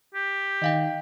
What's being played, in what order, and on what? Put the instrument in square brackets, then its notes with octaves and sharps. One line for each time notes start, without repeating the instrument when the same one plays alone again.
[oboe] G4
[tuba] D#3 [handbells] D#5 F5 G5